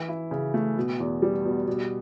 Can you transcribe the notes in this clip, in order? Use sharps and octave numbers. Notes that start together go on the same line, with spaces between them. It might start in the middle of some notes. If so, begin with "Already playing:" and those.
Already playing: E3
E4
C#3
A3
B2
E2
G3
B2
B2